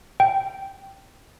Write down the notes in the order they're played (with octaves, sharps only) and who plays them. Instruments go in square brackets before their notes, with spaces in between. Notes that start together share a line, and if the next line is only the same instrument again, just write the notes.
[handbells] G5